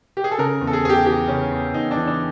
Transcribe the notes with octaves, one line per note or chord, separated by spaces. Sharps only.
G4
G#4
A4
C#3 A#4
E2
A4
G#4
E2 G#4
G4
E3 G4
C#3 C#4
E2
E2 D#4
E3 D4
D4